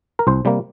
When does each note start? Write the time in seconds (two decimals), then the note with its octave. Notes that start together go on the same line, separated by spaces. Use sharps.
0.19 A#4
0.27 C2 C5
0.45 C3 G3 A#3